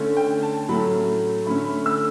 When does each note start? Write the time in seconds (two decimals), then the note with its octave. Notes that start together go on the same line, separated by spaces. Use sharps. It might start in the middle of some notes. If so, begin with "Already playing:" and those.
Already playing: D3 A3 C#4
0.17 G5
0.43 A5
0.69 A2 F#3 A3 C#4 B5
1.46 D3 A3 C#4 B5
1.65 B5
1.86 E6